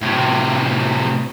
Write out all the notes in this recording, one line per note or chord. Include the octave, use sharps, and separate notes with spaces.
A2 C3